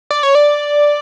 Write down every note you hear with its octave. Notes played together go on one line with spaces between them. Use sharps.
D5
C#5
D5